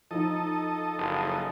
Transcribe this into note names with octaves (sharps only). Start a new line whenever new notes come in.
F3 D#4 A4 D#5
F#1